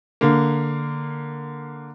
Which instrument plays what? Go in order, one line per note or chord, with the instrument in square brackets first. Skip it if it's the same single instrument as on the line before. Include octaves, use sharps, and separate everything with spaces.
[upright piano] D3 A#3